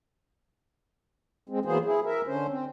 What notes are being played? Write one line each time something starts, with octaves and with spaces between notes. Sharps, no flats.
G#3 C4
E3 F#3 A#3 B3 G#4 C5
E4 G#4
A#4 E5
D3 C#4 C5
C4